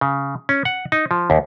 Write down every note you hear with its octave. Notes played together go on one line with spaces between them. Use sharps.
C#3
C#4
F#5
D#4
F3
D#2